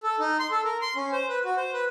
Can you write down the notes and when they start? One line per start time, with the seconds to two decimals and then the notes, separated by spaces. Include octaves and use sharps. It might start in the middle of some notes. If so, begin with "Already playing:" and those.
0.03 A4
0.20 D#4
0.39 C6
0.51 A4
0.65 A#4
0.82 C6
0.96 C#4
1.12 C5
1.29 B4
1.45 F#4
1.57 C5
1.73 B4